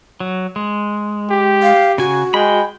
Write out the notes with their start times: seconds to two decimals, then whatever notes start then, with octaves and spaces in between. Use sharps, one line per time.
0.20 F#3
0.56 G#3
1.30 G4
1.62 F5
1.98 C#3 F#4 G#5
2.34 G#3 G5 B5